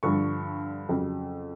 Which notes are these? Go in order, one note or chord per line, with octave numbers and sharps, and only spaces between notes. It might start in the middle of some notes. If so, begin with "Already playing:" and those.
G2 D3 F3 C#6
F2 C#3 F#3